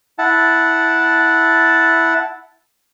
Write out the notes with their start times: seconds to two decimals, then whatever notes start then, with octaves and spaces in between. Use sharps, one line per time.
0.19 E4 F#5 A5